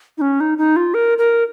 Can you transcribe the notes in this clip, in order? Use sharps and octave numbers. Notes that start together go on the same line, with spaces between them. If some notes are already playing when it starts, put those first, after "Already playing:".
D#4
C#4
D#4
D#4
F4
A#4
A#4